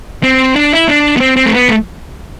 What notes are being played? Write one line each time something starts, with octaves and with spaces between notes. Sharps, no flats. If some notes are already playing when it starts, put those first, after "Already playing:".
C4
D4
E4
D4
B3
C4
C4
A3
B3
A3